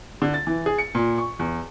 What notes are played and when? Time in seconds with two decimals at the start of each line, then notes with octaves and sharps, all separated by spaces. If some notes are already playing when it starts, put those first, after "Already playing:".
0.22 D3
0.34 A6
0.47 E3
0.66 G#4
0.78 C#7
0.95 A#2
1.18 C#6
1.39 E2